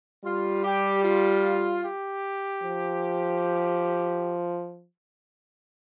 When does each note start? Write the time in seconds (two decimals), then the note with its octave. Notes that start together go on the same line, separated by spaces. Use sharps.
0.24 G3 F4
0.64 G4
1.03 F4
1.84 G4
2.63 F3